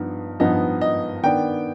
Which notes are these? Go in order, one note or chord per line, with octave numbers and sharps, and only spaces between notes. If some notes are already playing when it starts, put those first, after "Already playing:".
Already playing: G2 F3 B3 D#4
G2 F3 B3 D#4 D#5
D#5
D#3 B3 D4 G5